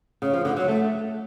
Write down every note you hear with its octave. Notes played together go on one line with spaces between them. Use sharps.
C#3
F3
D3
F#3
A3